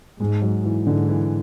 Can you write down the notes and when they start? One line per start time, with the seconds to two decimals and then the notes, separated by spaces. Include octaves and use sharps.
0.20 G#2 G#3
0.42 F#3
0.64 E3
0.86 G#2 D3
1.09 E3